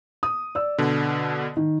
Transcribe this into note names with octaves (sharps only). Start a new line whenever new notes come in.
D#6
D5 E6
B2 D3
D#3